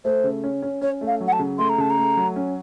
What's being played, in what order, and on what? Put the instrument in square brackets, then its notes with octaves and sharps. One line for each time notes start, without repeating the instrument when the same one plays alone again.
[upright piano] A3 [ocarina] C5
[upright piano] C#3
C#4
C#4
[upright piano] C#4 [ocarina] C#5
[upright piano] A3
[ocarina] F5
[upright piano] F#3
[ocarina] F#5
A5
[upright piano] C#3
[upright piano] A3 [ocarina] C6
[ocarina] A#5
[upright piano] C#3 [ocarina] A5
[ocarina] A#5
[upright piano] A3
F#3
C#4